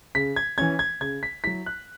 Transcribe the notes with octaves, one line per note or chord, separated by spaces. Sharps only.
C#3 B6
G#6
E3 C#4 G#6
G#6
C#3 G#6
B6
F#3 E4 B6
F#6